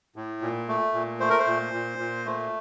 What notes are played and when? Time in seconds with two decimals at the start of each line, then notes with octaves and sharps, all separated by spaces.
0.16 A2
0.42 A#2
0.68 A3
0.94 A#2
1.20 A3 C5
1.30 A#4
1.39 C5
1.47 A#2
1.73 A#2
1.98 A#2
2.26 A3